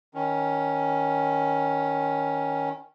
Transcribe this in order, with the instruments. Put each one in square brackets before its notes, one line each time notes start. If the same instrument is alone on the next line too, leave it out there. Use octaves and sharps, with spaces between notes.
[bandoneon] D#3 C#4